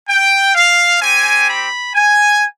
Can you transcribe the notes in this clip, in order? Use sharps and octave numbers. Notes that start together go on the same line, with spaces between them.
G5
F5
C4 G4 G#5
B5
G#5